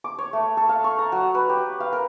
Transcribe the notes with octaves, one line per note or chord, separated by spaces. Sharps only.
D6
C#5
A3
A4
F5
C#6
A#5
F#3
B4
G4
F5
A#4